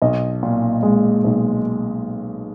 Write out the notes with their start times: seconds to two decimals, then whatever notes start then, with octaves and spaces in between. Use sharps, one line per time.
0.02 B1 D#5
0.43 A#2
0.83 G#3
1.24 B1